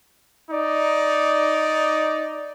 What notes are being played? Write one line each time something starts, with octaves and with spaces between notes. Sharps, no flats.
D#4 D5